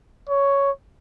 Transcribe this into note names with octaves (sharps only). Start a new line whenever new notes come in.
C#5